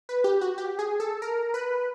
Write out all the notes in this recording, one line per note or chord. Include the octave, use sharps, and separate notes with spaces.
B4
G4
F#4
G4
G#4
A4
A#4
B4